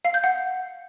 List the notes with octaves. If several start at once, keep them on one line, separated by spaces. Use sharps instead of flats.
F5
G6
F#5